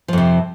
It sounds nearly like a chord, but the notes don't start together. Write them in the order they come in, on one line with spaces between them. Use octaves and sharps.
F3 F2 C3